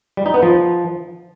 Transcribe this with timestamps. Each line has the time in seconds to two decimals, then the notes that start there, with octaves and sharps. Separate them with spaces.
0.17 G3
0.26 D#4
0.34 B3
0.42 F3